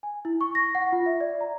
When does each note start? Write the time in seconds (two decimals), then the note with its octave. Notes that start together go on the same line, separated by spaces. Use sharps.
0.03 G#5
0.25 E4
0.41 C#6
0.55 A#6
0.75 F#5
0.92 F4
1.06 E5
1.21 D5
1.41 A#5